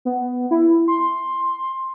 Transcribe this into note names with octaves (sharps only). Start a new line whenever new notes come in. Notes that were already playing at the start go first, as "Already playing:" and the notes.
B3
E4
C6